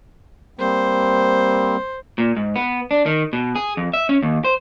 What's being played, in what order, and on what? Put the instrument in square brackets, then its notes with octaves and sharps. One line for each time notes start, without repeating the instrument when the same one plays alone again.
[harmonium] G3 A#3 C4 [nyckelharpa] C5
[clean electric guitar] A#2
G#2
B3
D4
D#3
B2
G#4
F2
E5
C#4
D#2
C5